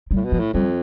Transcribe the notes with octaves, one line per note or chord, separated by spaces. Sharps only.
G3
A2
B2
F3
A2
F2 G3